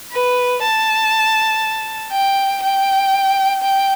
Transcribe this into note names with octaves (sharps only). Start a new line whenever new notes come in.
B4
A5
G5
G5
G5